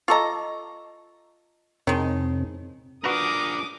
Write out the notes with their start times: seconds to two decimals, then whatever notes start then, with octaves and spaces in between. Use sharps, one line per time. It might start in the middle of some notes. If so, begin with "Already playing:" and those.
0.08 F4 A4 D#5 A#5 C#6 D6
1.87 F2 C3 D#3 G#3 C4 D#4 E4 C#5
3.04 D4 F4 F#4 A#4 B4 A#5 D6 D#6